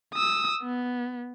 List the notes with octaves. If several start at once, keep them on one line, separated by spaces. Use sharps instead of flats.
D#6 E6
B3